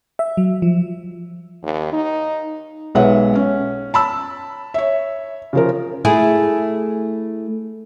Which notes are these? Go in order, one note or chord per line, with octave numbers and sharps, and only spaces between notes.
E5
F#3
F3
D#2
D#4
B1 G#3 B4 C#5 E5 F#5
C#4
A5 B5 E6
C#5 E5
C#3 F3 A#4
A3 E4 G#4